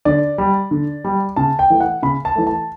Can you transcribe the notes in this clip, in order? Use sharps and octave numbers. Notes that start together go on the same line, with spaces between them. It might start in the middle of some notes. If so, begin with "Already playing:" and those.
D3 D5
G3
D3
G3
C#3 A5
G5
E3 A3
F#5
C#3 B5
A5
E3 A3
A5